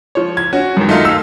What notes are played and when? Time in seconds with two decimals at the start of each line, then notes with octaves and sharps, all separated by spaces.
0.15 F3 C#5
0.37 G#6
0.53 C#4 F#4
0.77 F#2 D#3
0.89 A3 D#4 F4
1.05 F5 E6